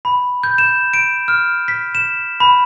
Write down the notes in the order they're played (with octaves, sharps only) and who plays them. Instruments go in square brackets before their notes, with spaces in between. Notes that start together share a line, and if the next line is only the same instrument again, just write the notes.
[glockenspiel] B5
G6
E7
D7
F6
B6
E7
B5